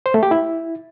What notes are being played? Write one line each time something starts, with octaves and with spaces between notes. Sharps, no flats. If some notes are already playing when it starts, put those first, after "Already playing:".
C5
A3
G4
E4